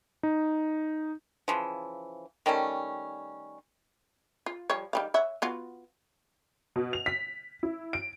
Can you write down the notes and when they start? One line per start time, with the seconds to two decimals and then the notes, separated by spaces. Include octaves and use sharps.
0.23 D#4
1.48 C#3 E3 F3
2.46 D#3 G3 A3 C#4
4.46 F4
4.70 F3 G3 C#5
4.93 D#3 G3 F5
5.14 C#5 E5 F#5
5.42 B3 F4 F#4
6.76 B2
6.93 F7
7.06 B6
7.63 E4
7.93 D7